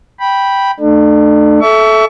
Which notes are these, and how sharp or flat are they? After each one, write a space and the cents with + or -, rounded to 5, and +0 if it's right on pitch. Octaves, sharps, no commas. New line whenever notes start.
G5 +0 B5 -10
A3 +0 D4 +35
A4 -20 E5 +0 C#6 +35